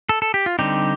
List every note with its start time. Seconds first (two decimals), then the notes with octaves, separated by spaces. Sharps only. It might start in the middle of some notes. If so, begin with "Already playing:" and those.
0.09 A4
0.22 A4
0.34 G4
0.46 F4
0.59 D3 G3 C4 D#4 G4